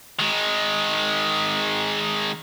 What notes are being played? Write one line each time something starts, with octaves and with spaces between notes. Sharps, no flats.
D#3 G#3